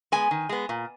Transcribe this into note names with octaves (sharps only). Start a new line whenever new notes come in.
G#3 B3 G#5
D#3
G#3 B3
A#2